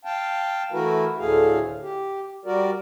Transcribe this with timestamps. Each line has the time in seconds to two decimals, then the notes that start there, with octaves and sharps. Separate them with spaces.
0.05 F5 G5 A5
0.72 E3 A3 E4 F#4 A#4 B4
1.18 D2 A2 D3 A3 G#4 F5
1.82 G4
2.45 G3 F#4 A#4 D5